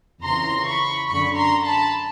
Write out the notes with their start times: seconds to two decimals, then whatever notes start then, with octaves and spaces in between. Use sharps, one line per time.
0.23 F2 C#3 E3 A#5 C6
0.66 B5 C#6
1.08 F#2 D3 B5 C#6
1.36 A#5 C6
1.66 A5 B5